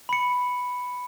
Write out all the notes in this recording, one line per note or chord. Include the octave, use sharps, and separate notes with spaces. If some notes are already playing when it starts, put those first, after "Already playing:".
B5 C#7